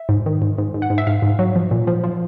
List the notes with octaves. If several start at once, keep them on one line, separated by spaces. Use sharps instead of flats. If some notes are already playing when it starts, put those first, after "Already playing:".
Already playing: E5
G#2
D#3
G#2
G#2
G#2
F#5
G#2
E5
G#2 F5
G#2
F#3
F3
A#2
F3
F3